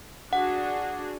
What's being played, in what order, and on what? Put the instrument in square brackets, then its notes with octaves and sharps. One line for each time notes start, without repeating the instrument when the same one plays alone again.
[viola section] D4 F#4 G#4 [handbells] F#5